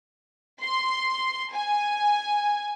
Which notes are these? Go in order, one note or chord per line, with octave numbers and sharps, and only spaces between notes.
C6
G#5